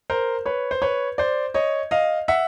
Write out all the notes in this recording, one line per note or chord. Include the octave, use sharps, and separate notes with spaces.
A#4 C5
B4 C#5
C5
B4 C#5
C5 D5
C#5 D#5
D#5 F5
E5 F#5